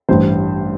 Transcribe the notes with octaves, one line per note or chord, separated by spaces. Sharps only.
A1 G2 E3 C5